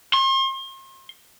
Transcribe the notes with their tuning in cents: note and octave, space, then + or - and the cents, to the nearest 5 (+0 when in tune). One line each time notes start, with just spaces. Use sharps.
C6 +40